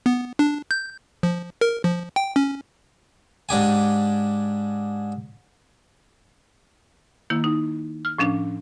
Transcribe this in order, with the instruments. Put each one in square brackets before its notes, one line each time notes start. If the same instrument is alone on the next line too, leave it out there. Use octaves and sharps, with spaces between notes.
[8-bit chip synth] B3
D4
G6
F3
A#4
F3
G5
C#4
[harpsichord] G#2 D4 G4 G#5
[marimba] D#3 A#3 E4
D#4
F6
A2 F3 C#4 D4